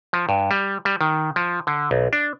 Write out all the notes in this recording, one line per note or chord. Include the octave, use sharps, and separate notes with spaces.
F3
G2
G3
G3
D#3
F3
D3
B1
D4